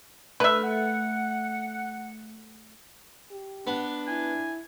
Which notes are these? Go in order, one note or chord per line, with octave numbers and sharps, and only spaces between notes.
A3 D4 B4 E5 F6
F#5
G4
B3 D4
E4 G#5